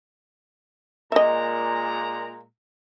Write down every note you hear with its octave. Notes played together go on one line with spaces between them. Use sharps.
A#2 G#3 D#5 E5 A#5